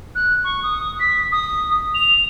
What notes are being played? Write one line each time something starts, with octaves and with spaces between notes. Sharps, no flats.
F#6
C#6
D#6
B6
D#6
F7